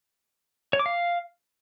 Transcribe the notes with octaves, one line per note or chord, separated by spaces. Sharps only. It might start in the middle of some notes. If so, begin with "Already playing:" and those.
C#5
D6
F5